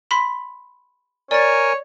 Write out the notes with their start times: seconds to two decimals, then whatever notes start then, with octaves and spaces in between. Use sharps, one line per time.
0.11 B5 C6 B6
1.31 A#4 C#5 D5 G#5 A6